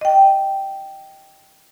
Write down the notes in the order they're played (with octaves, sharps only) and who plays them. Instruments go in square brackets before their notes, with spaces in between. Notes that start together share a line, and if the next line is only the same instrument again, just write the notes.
[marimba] D#5 G5